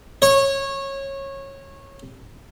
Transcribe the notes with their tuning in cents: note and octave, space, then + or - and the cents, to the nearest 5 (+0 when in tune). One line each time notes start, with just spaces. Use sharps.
C#5 -20